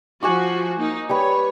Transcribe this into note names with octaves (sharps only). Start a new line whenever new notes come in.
F3 F4 F#4 G#5 C#6 D6
A#3 D#4
G3 B4 C#5 B5